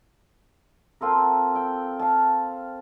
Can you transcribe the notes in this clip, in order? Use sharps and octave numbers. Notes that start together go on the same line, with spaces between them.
C4 F4 A4 A#4
G5
F5 A5